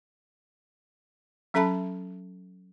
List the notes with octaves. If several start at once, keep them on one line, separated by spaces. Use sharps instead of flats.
F#3 C#4 A4 E5 A5 B5